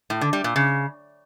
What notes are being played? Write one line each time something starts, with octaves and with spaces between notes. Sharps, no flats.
A2
D3
G3
A#2
C#3